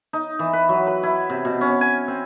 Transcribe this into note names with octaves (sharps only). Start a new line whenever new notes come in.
D#4
E3
B4
F#3
B4
E4
C3
B2
C#4
G#5
C4